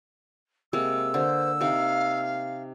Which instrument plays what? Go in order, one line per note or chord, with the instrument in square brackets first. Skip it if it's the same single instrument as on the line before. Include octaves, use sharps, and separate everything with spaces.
[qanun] C3 G#3 A#3 [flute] E6
[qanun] D3 [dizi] C5
[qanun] C3 D#4 [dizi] F5